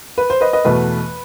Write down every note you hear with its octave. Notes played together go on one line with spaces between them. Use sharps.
B4
C5
B4 D#5
B4 D#5
E2 B2 A3 B4